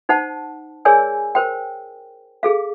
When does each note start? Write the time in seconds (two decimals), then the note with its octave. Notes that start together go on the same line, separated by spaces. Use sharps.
0.09 D#4 C5 F#5 A5
0.85 G#4 A#4 C#5 D5 G#5 E6
1.35 A#4 C5 G5
2.43 G#4 A4 F5